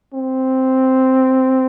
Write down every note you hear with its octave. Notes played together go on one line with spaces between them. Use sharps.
C4